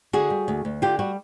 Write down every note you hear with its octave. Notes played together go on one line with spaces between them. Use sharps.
D3 F#4 G#4
G3
D2
D2
D3 F4 G4
G3 F#4